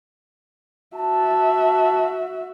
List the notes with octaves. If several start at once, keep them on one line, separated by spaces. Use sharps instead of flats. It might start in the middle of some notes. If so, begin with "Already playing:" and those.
F#4 E5 A5